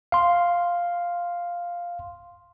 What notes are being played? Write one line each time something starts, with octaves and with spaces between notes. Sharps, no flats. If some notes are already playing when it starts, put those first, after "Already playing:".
F5 C6